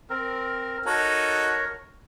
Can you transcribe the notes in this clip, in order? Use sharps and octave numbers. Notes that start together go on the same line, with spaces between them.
C4 A#4
D#4 F#4 A4 A#4 C#5 A#5